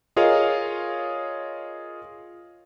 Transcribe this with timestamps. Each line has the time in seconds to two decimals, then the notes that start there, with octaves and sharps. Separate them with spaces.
0.16 F4 G#4 A#4 C#5 D#5 F5